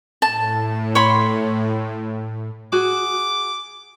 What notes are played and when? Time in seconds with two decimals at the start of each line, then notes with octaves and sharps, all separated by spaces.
0.22 A2 A5
0.95 C#5 B5 C6
2.73 F#4 G#4 D6